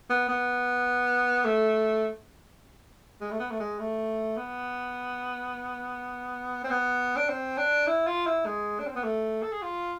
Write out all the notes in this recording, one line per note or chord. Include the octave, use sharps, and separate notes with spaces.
B3
B3
A3
G#3
A3
B3
A3
G#3
A3
B3
C4
B3
D4
C4
D4
E4
F4
E4
G#3
D4
C4
B3
A3
A4
G#4
F4